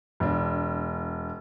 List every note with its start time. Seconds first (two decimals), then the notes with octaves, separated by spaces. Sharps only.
0.20 E1 D4